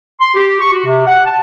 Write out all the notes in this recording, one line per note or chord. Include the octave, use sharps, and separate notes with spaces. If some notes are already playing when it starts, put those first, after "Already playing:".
C6
G4
C#6
F#4
C3
F#5
A5